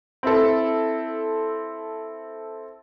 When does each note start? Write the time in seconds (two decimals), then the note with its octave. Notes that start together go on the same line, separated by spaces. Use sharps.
0.23 C4 E4 A4